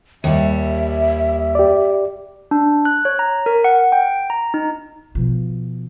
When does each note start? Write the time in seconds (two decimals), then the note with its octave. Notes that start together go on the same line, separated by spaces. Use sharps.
0.24 D#2 G3 E5
1.55 G4 D5
2.51 D4
2.85 F#6
3.05 C#5
3.19 A#5
3.46 A#4
3.64 F#5
3.92 G5
4.30 A#5
4.54 D#4
5.15 B2 F3